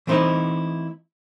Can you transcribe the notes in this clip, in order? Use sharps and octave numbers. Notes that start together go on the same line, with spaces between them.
E3 A3 C4 D#4 E4 D#5